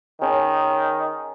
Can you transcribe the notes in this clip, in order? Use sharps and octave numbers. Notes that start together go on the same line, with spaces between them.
D#3 C#4 G#4